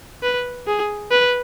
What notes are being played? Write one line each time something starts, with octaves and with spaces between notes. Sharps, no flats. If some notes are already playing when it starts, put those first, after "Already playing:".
B4
G#4
B4